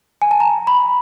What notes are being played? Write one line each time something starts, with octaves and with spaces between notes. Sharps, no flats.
G#5
A5
A#5
B5